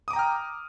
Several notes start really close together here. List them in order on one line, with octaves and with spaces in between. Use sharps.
D#6 D6 A#5 G5 F6